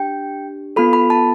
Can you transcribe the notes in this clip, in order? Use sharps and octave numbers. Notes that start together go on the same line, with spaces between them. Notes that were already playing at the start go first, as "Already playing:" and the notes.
Already playing: D4 G4 G5
B3 F4 A4 B5
B5
A5